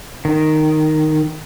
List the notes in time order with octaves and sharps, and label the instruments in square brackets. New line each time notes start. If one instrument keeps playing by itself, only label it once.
[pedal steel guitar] D#3